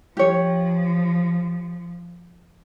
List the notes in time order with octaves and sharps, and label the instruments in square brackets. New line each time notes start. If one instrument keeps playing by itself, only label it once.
[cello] F3 [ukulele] G4 C#5